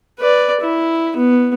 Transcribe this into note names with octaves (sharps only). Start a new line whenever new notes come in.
B4 D5
E4
B3